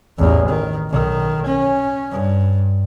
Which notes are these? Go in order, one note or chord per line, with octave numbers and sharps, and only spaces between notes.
A1 E2
D#3
B1 D#3
C#4
G2